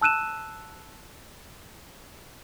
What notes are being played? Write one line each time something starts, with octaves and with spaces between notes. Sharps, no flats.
A5 E6 F#6 D#7 E7